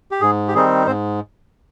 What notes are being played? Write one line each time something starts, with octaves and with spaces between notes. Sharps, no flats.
G4
G#2 G#4
G4
D#3 G3 C4 D#4 G#4
G#2 C4 C5